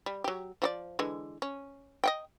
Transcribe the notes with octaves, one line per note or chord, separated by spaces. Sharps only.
G3
F#3 G4
F3 F#4 D5
D3 E3 G#3
C#4
D#5 F#5 G5